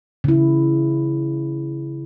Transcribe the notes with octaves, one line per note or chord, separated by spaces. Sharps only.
C#3 E4